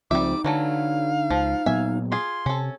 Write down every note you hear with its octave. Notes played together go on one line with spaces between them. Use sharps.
C#2 F3 G3 C4 D#4 E5 D6
D3 E3 F#3 A3 F5
C#2 F3
A#2 F#3 B3 E5 G#5
F4 G#4 C6
C3 C#4 A4